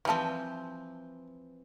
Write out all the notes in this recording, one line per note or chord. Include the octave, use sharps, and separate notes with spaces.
E3 F3 G3 C4 A5